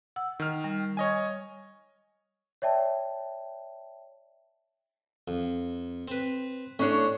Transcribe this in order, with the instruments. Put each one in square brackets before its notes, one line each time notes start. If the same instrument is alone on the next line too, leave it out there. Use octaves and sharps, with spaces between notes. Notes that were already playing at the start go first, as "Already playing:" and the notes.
[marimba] F#5 E6
[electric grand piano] D#3 F6
[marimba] G3
[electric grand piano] C#5 D#5 G#5
[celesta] C#5 D5 E5 G5 A5
[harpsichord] F2
C4 B4
[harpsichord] A2 [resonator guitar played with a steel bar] C#4 D4 C#5